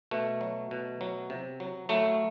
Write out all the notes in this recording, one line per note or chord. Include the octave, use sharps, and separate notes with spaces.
B2 A3
F#3
B2
F#3
C3
F#3
F#3 A3